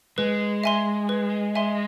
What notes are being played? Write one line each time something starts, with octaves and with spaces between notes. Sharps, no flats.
G#3 B4
E5 G#5 C6
B4
E5 G#5 C6